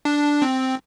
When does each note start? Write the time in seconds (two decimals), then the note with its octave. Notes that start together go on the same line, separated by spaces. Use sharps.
0.05 D4
0.42 C4